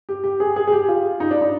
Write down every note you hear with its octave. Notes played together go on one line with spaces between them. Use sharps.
G4
G4
G#4
G#4
G#4
G4
F4
D#4
D4
D#4